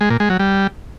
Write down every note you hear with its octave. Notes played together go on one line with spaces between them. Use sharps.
G#3
A#2
G#3
F#3
G3